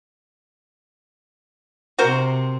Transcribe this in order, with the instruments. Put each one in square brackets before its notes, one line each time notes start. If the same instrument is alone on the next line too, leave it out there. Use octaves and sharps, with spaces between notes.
[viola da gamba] C3 [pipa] F#4 A#4 C5